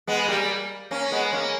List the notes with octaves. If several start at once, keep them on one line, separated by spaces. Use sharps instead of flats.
G#3 B3
G3 A#3
A#3 C#4
G#3 B3
A#3 C#4